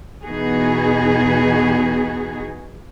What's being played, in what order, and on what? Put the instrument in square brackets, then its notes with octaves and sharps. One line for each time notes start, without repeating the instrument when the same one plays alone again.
[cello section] E2 B2 B3 D#4 F#4 G#4